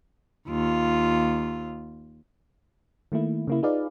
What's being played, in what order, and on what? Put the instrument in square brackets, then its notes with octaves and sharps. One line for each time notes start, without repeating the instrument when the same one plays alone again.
[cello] D#2 F4
[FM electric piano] D#3 A3 A#3 E4
C#3 A#3 E4
D#4 F4 G#4 B4 D5 F5